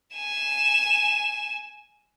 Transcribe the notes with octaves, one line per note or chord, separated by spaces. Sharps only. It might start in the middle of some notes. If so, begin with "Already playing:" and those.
G#5 E7